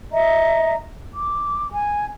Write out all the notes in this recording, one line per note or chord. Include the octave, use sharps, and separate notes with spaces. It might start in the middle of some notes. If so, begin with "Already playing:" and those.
D#5 E5 A#5
D6
G#5